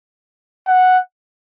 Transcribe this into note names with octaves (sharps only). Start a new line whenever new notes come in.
F#5